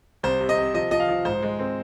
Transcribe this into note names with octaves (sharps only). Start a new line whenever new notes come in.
C2 C5
C3
D#5
C3
F3 D#5
F3 D#5
F5
F3
G#2 C5
G#3
C4